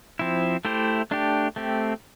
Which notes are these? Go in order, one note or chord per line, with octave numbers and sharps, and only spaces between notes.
F3 C4 E4
A3 E4 G4 C5
A3 D4 G4
A3 C4 G4